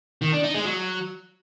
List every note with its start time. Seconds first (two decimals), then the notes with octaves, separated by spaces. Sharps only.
0.22 D#3
0.32 D4
0.43 D#4
0.54 G#3
0.65 F#3